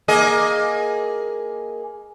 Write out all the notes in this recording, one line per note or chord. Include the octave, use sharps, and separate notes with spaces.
A#3 G#4 D#5